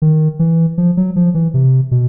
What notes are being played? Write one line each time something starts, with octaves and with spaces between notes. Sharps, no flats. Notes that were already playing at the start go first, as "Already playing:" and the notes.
D#3
E3
F3
F#3
F3
E3
C3
B2